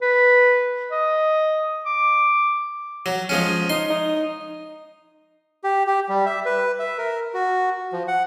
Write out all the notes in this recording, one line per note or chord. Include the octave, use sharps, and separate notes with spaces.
B4
D#5
D6
F#3
F3 G#3 C#4
D#4 C6
D#4
G4
G4
G3
E5
B4
E5
A#4
F#4
F3
F#5